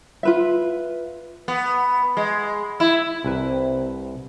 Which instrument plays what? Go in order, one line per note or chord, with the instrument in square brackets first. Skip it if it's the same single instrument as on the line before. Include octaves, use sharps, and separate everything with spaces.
[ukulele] F4 B4 E5
[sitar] B3
G#3
E4
[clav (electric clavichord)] C2 B4 [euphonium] C3